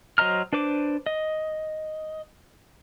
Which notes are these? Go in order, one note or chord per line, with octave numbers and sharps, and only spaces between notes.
F#3 C5 D#5 A#5 F6
D4 B4 C5 D6
D#5